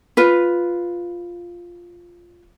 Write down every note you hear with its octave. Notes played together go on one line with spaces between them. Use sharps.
F4 B4